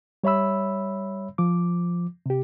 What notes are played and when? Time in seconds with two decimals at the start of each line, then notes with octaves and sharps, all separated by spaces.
0.24 G3 C#5 E5 B5 E6
1.38 F3 D6
2.26 C3 G4